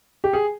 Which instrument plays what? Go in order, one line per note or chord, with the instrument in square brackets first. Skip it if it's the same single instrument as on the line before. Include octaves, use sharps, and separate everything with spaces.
[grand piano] G4
G#4